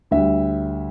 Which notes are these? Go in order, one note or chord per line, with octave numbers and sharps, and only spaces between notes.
D2 D3 G3 E5